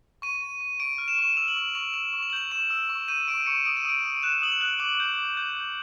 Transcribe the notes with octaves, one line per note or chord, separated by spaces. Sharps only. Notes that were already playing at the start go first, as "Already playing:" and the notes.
C#6 D#7
C#6
C#6
C#6 D7
F6
E7
C#6 E7
E6 F7
F#7
C#6 F7
C#6 F7
E6 F7
C#6
F7
F#7
G6 F7
C#6 E7
E6
C#6
G6 D#7
C#6 D7
C#6 C#7
D#6 D7
D#7
D#6 D7
D#6
F#6 E7
D#6 F#7
F7
F#6
D6 F#7
G6
D6
G6
D6